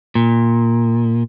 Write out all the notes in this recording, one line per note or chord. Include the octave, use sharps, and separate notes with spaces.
A#2